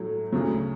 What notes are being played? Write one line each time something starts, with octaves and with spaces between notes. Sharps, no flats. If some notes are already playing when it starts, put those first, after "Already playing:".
Already playing: A2 F#3 A3
D2 C#3 F#3